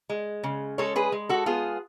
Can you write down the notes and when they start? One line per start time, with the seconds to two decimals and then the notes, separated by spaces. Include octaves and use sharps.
0.10 G#3
0.44 C#3
0.78 G#3 A4 C#5
0.96 G#4 B4
1.12 G#3
1.29 F#4 A4
1.46 B3 F4 G#4